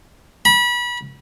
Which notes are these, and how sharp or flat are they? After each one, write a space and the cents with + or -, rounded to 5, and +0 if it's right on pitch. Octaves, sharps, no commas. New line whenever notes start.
B5 -30